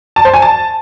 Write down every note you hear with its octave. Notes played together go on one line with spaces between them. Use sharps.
A5
C5
G#5
A5